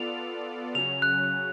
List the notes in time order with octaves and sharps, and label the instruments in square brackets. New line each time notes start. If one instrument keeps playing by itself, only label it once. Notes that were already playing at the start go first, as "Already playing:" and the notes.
Already playing: [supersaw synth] B3 F4 A4 D5 [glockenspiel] F7
[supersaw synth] C#3 F#3 C#4 [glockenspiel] F7
[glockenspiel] F#6